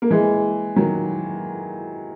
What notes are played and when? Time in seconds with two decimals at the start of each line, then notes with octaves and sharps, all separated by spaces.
0.02 A#3
0.11 E3 G#3
0.76 D#3 F#3